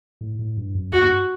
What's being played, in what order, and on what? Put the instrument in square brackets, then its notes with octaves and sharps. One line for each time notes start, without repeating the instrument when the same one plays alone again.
[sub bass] A2
A2
G2
F#2
[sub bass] E2 [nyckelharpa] F#4
[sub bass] G2